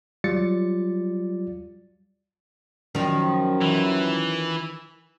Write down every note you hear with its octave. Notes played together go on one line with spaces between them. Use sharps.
F#3 G3 F4 D5 A6 C#7
F#2 D#3 F3
E3